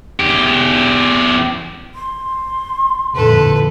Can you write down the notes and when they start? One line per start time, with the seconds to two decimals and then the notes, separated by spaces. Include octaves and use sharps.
0.20 E2 G4
1.95 C6
3.14 F2 A#2 D3 E3 A4 B4